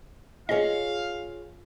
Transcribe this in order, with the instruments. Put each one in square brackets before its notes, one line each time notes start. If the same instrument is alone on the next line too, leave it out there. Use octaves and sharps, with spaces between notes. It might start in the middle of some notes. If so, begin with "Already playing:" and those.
[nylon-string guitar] F4 G#4 C#5 [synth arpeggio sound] D#5 [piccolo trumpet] F5